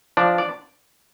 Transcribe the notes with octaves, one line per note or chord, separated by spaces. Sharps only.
F3 D4 D5
D5